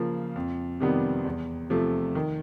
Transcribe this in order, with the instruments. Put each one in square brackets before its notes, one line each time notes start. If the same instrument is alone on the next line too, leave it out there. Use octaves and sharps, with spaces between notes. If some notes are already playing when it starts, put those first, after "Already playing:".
Already playing: [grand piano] C#3 F3 A#3
F2
C3 D#3 G3 B3
E2
C3 F3 A3
D#3